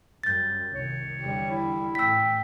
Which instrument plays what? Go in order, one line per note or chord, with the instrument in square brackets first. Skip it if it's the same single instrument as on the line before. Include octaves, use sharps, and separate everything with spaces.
[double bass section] F#2 G3 [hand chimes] G6 A6
[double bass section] C2 D#3 [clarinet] C#5
[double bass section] E2 D3 [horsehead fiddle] G3
[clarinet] E4
[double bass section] A1 [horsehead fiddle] G5 [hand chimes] E6 B6